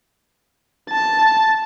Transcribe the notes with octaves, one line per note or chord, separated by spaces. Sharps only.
A5